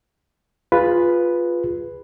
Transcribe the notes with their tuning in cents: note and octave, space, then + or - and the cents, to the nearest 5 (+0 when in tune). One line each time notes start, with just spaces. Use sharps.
F4 +5 G#4 -20 B4 +0